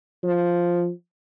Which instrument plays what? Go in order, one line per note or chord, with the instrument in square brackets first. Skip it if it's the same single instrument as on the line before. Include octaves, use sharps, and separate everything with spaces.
[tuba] F3